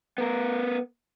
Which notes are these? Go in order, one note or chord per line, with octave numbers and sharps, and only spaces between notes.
B3 A#4